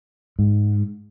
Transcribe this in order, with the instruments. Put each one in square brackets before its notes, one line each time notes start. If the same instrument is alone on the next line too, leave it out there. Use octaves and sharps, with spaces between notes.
[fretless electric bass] G#2